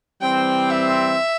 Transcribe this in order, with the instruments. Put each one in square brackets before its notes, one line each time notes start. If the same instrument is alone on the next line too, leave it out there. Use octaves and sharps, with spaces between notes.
[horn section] E3 G3 C4 [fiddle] G5
[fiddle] E5